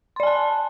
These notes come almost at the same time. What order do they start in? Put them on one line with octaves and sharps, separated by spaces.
C6 D5 G#5 A5